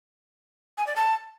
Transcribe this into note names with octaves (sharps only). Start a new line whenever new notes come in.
G#5
D5
A5